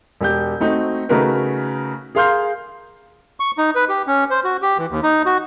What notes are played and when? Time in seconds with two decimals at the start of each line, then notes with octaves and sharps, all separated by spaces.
0.21 E1 G4 G6
0.60 A3 C4 D#4 F#4
1.09 C#3 A3 D#4 F#4 A#4 B4
2.15 G#4 A#4 F5 C6 F6 G6
3.40 C#6
3.58 D#4
3.75 B4
3.89 G4
4.07 C#4
4.31 C5
4.44 F#4
4.62 G4
4.78 E3
4.91 D#2
5.03 D#4
5.26 F#4